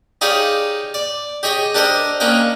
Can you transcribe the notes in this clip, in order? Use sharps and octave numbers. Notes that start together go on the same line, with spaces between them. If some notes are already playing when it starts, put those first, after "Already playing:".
D#4 G4 G#4 C#5 D5 F5
D5
G4 G#4 C#5 D#5 G5
D4 G4 A4 A#4 C5 D#5
A#3 C#4 D4 D#5 G5